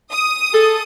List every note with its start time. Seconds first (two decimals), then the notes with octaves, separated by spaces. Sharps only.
0.11 D#6
0.52 G#4 A4